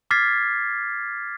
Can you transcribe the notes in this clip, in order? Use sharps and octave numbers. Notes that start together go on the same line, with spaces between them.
D6 F6 G#6 A6 B6 C7